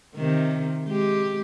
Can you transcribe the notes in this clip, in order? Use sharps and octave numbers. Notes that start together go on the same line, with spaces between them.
C3 D#3
G#3 G4